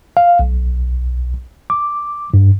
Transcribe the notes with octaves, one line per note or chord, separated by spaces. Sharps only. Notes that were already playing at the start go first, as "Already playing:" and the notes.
F5
B1
D6
G2